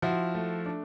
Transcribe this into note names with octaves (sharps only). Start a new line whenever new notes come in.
F3 E4 F#4
A3
D4